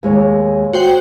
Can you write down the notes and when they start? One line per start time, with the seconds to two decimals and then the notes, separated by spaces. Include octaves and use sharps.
0.03 D#2 G#3 C#5
0.73 F#4 C5 G5